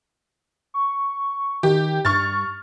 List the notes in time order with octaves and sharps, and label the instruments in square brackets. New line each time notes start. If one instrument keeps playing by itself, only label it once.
[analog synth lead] C#6
[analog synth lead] D#3 [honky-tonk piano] G4
[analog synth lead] G2 [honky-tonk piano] C#6 F6 A6